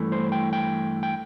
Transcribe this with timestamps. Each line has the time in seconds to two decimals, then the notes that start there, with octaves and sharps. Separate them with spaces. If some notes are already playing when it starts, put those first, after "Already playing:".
Already playing: G2 E3 A3
0.12 C5
0.32 G5
0.53 G5
1.03 G5